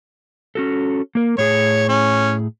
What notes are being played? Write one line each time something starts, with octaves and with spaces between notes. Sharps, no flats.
C#4 F#4 A4
A#3 A#4
A2 G#4 C#5
C#4